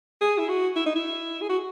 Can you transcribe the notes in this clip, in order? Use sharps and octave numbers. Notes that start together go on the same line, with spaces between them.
G#4
E4
F#4
E4
D#4
E4
G#4
F#4